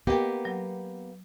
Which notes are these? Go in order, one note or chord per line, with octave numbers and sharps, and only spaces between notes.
A#3 B3 G4 A#4 D#5 G5
F#3